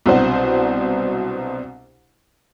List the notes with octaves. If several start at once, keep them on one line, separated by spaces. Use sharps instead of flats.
C2 B2 F#3 D4 C5 F#5